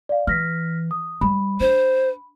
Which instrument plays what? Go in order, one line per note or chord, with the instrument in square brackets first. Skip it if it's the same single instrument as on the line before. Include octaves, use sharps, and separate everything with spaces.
[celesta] D5 F5
[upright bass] E3 [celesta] F6 A#6 B6
[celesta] D#6
[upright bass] G3 [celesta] B5
[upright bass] D4 [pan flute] C5